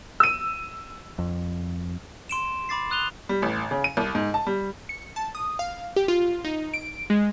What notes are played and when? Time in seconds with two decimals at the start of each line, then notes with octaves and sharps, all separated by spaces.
0.20 E6 D#7
1.19 F2
2.29 C6 D7 E7
2.69 B5 D6 A6 C7
2.90 C6 D#6 F#6 D#7 F7 G7
3.29 G3
3.42 A1
3.71 C#3
3.84 D#7
3.97 C2
4.15 G#2
4.34 A5
4.47 G3
4.89 C#7
5.16 A5
5.35 D#6
5.59 F5
5.96 G4
6.08 F4
6.45 D#4
6.74 D7
7.10 G#3